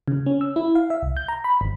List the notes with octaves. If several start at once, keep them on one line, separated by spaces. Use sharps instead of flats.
C#3
C#4
E6
E4
F5
E5
C2
G6
A#5
B5
G1